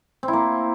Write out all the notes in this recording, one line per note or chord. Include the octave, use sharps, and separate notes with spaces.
C4
E4
A#3